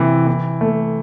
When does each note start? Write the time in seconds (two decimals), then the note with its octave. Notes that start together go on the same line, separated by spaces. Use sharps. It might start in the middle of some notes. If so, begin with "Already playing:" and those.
Already playing: C3 E3
0.27 E3
0.61 A3